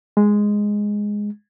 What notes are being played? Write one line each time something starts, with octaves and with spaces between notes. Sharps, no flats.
G#3